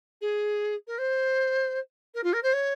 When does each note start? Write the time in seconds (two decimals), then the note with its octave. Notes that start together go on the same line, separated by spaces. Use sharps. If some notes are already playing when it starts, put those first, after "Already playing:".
0.21 G#4
0.87 A#4
0.98 C5
2.15 A#4
2.24 F4
2.33 A#4
2.43 C5
2.53 C#5